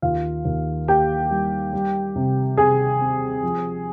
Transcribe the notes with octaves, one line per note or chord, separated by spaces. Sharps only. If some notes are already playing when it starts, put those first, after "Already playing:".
D#2 F4 F5
D#2
A#3 G4 G5
G3
G3
C3
C3 G#4 G#5
C4
F3